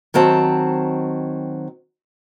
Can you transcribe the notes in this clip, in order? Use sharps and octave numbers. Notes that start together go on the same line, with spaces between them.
D#3 F#3 C4 A5